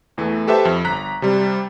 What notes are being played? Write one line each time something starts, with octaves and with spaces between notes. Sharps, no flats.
E2 E3 A3
G4 A4 B4 C5 E5 A5
F2
G1 A#5 F#6 B6
C3 G3